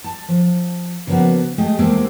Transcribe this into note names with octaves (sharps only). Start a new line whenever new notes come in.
A5
F3
C#3 F3 A#3 B3 F#4
G#3 A3 G4 D#5
E2 C3 G#3 A#3 C4 A4